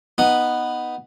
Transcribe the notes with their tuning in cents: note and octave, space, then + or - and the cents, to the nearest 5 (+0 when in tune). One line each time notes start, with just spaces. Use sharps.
B3 +0 D#4 +0 F#5 +0